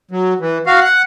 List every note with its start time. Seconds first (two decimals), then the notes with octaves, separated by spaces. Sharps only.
0.11 F#3
0.40 E3
0.66 F#4 F5
0.81 F#5